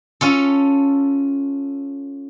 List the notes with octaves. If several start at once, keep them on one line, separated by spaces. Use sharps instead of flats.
C#4 F4 A4